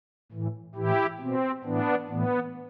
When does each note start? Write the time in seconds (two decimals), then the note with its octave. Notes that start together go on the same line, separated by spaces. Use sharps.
0.32 A2 E3
0.75 A2 E3 E4 G4
1.20 B2 C4
1.64 A2 E3 B3 D4
2.08 A2 E3 B3